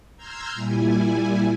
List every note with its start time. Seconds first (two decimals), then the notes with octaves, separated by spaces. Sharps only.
0.16 A#5 C6 E6 F6 G6 G#6
0.54 A#2 G3 E4 G#5